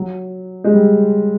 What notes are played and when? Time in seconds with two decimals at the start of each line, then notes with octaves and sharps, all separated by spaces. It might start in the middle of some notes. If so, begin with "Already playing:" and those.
Already playing: F#3
0.64 G#3
0.74 G3